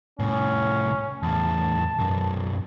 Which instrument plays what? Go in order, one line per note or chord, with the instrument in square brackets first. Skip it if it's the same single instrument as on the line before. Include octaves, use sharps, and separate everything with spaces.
[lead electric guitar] C2 A2 [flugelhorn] C#4
[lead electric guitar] E2 A2 [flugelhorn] A5
[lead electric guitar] B1 F#2